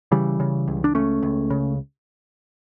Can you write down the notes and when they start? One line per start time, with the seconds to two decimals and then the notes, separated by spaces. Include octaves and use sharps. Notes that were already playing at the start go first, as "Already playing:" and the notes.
0.12 C#3 E3 G3
0.40 C#3
0.68 C#2
0.84 D4
0.95 C#2 A3 C#4
1.23 C#2
1.50 C#3